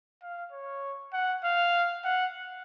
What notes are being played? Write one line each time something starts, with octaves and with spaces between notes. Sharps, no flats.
F5
C#5
F#5
F5
F#5